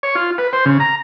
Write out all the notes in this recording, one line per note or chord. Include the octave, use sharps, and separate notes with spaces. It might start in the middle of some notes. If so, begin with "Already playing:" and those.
C#5
F4
B4
C5
C#3
A#5